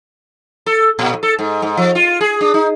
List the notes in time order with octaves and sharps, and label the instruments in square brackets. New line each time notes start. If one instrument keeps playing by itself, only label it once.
[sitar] A4
A#2
A4
G#2
G#2
F3
F4
G#4
D4
D#4